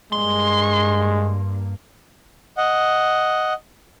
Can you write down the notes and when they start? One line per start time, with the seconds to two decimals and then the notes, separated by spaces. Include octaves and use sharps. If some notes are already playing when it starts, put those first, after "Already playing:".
0.12 G2 G#3 A#3 C6
2.58 D#5 F#5